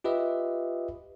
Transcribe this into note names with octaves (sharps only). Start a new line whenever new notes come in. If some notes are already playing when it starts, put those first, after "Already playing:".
F4 G4 B4 D#5 E5